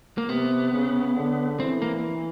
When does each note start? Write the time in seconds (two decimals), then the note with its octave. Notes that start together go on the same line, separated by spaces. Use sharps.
0.18 A#3
0.29 C3 B3
0.73 C#3
1.16 D3
1.60 E3 C4
1.82 A#3